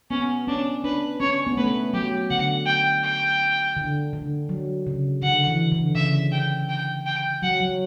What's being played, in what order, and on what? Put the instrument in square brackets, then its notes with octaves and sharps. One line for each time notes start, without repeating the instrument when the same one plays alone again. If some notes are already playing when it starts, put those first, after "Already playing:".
[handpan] B3 [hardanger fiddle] C#4
[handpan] C#4 [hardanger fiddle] D4
[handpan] D4 [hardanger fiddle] B4
[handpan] C#4 [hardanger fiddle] C#5
[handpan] B3
[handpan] A3 [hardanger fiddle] B4
[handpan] F#3 [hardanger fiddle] G4
[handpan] D3 [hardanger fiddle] F#5
[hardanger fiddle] G5
G5
[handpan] D3
D3
F#3
C#3
[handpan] D3 [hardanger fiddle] F#5
[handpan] E3
D3
[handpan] C#3 [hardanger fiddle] E5
[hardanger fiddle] G5
G5
G5
[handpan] F#3 [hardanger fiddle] F#5
[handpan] F#3